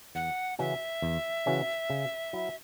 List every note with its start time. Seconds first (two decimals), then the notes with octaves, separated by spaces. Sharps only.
0.15 E2 F#5
0.59 C#3 E3 C#4 F#4 E5
1.02 E2
1.46 C#3 E3 C#4 F#4
1.90 C#3
2.33 F#3 E4